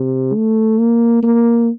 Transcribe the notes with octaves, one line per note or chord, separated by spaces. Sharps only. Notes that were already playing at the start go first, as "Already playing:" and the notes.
Already playing: C3
A3
A#3
A#3